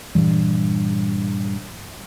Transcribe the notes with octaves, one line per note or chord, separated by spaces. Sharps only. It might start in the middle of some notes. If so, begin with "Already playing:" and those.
G2 A#2 E3 G3